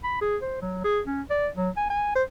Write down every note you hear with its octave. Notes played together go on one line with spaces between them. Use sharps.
B5
G#4
C5
F#3
G#4
C#4
D5
F#3
G#5
G#5
C5